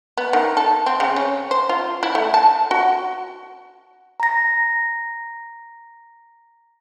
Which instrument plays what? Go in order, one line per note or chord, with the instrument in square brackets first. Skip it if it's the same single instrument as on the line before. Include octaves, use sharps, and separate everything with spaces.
[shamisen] B3
D#3
A4
C4
C#3
C#4
C5
F4
E4
A3
A5
F#4
[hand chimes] A#5 A#6